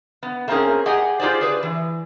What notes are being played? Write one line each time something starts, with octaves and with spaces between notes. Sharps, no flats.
B3
A3 A#3 C4 C#4 G#4 A#4
G4 G#4 D#5 F#5 G#5
F4 G4 G#4 C5 D5
G#4 B4 C5 D5
E3